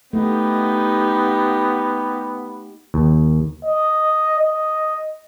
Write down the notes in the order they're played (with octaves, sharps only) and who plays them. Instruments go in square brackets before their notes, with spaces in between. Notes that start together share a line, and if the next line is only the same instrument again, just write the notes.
[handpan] A3 [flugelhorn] B3 [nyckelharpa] D#4 G4
[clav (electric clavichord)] D#2
[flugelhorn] D#5
D#5